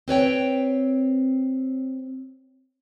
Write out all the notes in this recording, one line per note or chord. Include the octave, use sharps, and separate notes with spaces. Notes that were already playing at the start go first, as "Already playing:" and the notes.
C4 B4 C#5 G5